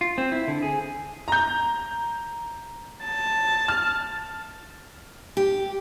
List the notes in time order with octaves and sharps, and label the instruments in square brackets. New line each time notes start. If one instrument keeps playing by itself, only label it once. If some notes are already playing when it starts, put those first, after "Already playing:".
[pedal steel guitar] F4
C4
E4
D3
G#4
[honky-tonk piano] A#5 G6
[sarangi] A5
[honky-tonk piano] F6
[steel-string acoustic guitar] G4